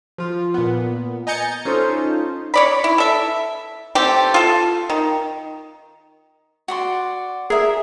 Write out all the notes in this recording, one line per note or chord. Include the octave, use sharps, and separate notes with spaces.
F3 F4
A#2 B3
D#5 G#5 A#5 G6 A6 C#7
C#4 D#4 F4 A4 C5
C#5 D5 B5
E4
A4 E5
A3 C4 G4 G5
F4 A4
D#3
F#4 D5 C6
G#4 A#4 E5